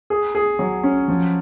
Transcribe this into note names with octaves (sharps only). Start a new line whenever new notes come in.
G#4
G#4
F#3
C#4
F3